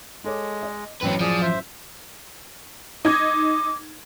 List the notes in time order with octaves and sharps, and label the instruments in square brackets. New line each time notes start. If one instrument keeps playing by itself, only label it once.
[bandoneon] G#3 [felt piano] A4 C#5 D6
[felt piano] D#5
[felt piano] A1 F#2 F#3 [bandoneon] C4 [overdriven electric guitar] C#4 B4
[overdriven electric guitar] F3 [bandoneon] G#4 D5
[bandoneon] C5 E5
[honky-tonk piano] D#4 G#6 [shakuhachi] D6